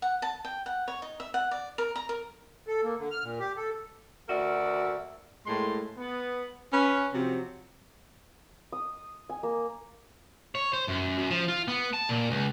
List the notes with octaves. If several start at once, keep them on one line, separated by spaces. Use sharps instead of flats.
F#5
A5
G5
F#5
C#5
D#4
E5
F#5
D5
A#4
A#5
A#4
A4
A#3
D3
F6
A#2
G4
A4
D2 F#4 A#4 D5 E5
A2 G#3 A#3 C6
B3
C#4 B4
C3 F3 F#3 C4
D#6
G#5
A#3
C#5
C5
F#2
F#2
F3
F4
B3
A5
A#2
C#2